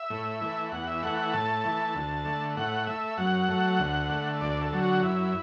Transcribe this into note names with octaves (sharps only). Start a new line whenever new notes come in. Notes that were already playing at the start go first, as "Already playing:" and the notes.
Already playing: E5
A2
E3 A3
E2 F#5
E5
E3 A3 F#5
F#5
A2 A5
E3 A3
D2
D3 A3
A2 F#5
A3 E5
F#2 F#5
F#3 A3
D2
D3 A3
D2 D5
A4
D3 F#3
F#4
F#2 E4